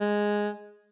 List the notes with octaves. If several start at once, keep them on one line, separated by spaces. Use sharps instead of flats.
G#3